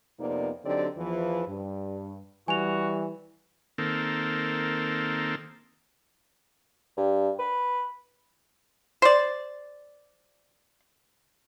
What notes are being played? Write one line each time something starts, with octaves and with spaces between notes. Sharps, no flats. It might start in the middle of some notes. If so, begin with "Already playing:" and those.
F2 C3 A#3 B3 D#4 D5
D3 F#3 C4 D#4 G4 D5
E2 E3 F3
G2
E3 G3 F#4 G#5 F7
D#3 A#3 C4 A4
G2
B4
C5 D5